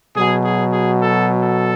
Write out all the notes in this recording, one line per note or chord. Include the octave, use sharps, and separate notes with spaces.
B2 F#3 G#4
G#4
G#4
A4
A4